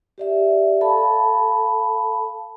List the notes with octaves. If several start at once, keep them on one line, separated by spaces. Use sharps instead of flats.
G4 D5 E5
A4 F5 A5 B5